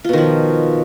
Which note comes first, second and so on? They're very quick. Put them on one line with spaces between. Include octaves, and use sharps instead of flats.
F4 B2 D#3 F3